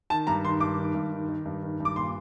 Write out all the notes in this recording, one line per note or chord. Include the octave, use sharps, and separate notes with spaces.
D#3 A5
G2 A#5
D#3 C6
G2 D6
D#3
G2
D#3
D#3
G2
D#3
G2 D6
A#2 C6